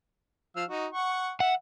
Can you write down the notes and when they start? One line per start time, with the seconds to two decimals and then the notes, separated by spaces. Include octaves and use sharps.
0.56 F3 F5 E6
0.69 D#4 F#4
0.93 F#5 C#6
1.40 E5 F#5